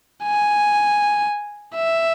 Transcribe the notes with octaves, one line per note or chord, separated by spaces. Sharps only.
G#5
E5